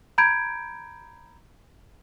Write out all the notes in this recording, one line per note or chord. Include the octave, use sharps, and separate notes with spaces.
A#5 B5 G6 G#6 D7